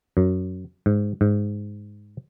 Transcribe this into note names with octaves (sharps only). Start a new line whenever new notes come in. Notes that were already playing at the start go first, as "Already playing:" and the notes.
F#2
G#2
G#2